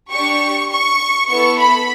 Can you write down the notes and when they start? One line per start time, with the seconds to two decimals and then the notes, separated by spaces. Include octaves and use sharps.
0.11 D4 G4 C#6
0.70 C#6
1.29 B3 E4 A4 C#6
1.59 B5